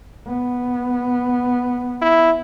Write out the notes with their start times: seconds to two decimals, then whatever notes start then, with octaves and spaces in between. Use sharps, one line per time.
0.27 B3
2.02 E4